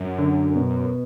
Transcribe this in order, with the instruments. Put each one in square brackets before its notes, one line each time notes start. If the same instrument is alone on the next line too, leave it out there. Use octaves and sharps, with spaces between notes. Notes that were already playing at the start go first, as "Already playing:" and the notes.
Already playing: [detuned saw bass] F#2
[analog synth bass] D3
B2